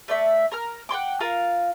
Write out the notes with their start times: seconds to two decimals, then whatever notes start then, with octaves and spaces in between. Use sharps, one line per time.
0.08 A3 D5 E5
0.52 A#4 A#5 F6
0.89 F#5 G5 C6 D6
1.21 F4 A#4 F5